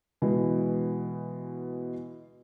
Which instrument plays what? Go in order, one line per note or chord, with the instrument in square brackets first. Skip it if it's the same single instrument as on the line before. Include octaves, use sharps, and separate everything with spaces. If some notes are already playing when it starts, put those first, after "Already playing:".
[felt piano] B2 E3 G#3